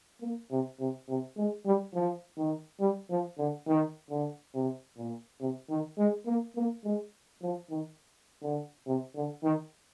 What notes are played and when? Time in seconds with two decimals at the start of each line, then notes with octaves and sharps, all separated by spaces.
0.21 A#3
0.51 C3
0.79 C3
1.08 C3
1.37 G#3
1.65 G3
1.94 F3
2.37 D#3
2.80 G3
3.10 F3
3.38 D3
3.67 D#3
4.10 D3
4.54 C3
4.97 A#2
5.40 C3
5.69 D#3
5.97 G#3
6.26 A#3
6.56 A#3
6.84 G#3
7.42 F3
7.70 D#3
8.42 D3
8.86 C3
9.15 D3
9.43 D#3